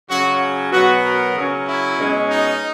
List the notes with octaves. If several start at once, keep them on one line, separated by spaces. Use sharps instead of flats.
C#3 F#3 C#4 F#4
B2 F#3 B3 F#4
A#4
C#3 F#3 C#4
E4
B2 G#3 C#4
D#4